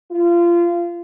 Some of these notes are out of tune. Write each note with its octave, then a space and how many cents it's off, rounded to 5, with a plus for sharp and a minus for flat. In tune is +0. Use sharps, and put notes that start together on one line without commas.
F4 -25